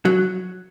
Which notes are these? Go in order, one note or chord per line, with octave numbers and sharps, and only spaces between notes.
F#3